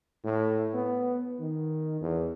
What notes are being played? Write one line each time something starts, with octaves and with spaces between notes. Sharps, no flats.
A2
B3
D#3
E2